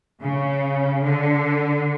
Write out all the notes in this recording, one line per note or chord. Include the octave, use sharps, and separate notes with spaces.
C#3
D3